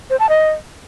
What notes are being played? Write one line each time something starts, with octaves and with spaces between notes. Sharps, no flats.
C5
A5
D#5